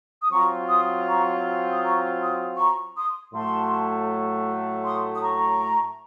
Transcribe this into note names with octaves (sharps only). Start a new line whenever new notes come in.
D#6
F#3 C4 F4 A#5 C#6
C6 D#6
A#5 C#6
D#6
A#5 C#6
C6 D#6
A#5 C#6
C6 D#6
A2 F#3 A3 A5 C6
C6 D#6
D#6
A#5 C#6